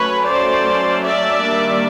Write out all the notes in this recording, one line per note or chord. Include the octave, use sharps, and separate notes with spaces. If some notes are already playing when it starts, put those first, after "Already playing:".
Already playing: F#3 A3 C#4 B4 C#5
C5 D5
D5 E5
D#3 G3 A#3 D4